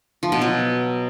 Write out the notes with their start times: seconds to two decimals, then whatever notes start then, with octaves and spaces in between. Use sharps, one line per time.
0.23 F3
0.32 B2
0.41 F#3